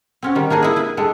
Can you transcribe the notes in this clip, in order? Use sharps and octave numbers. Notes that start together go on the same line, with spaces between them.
C4 C#4 F#4
D#3 G3
A#3 D4 D#4 G#4
E4 G#4
E4 B4
G3 G#3 D4 A4